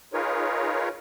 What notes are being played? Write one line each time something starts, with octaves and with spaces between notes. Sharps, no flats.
D#4 F4 G#4 A#4 B4 C#5